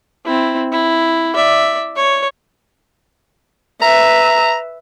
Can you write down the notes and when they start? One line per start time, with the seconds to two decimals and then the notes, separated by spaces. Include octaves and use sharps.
0.25 C4 E4
0.72 E4
1.35 D5 E5
1.96 C#5
3.82 B4 E5 A#5